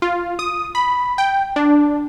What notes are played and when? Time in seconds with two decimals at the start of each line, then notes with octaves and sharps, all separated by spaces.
0.02 F4
0.39 D#6
0.75 B5
1.18 G5
1.56 D4